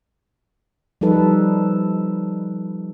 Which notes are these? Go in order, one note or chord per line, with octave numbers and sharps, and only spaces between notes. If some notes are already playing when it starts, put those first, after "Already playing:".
F3 G3 D#4 A4 B4